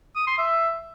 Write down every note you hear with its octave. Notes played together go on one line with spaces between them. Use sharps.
D#6
C6
E5